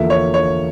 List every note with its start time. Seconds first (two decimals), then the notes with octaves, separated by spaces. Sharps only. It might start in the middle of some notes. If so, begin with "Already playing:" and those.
Already playing: E2 D3 F3 A#3 E5
0.10 C#5
0.34 C#5